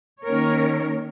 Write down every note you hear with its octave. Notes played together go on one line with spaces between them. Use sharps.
D#3 A#3 C#4 A#4 C#5